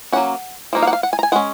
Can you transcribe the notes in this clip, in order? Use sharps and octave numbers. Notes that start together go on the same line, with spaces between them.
F#3 A#3 C#4 F#5
F3 A#3 D#4
F5
F#5
F5
F#5
G#5
A#5
G#5
G#3 C#4 F#5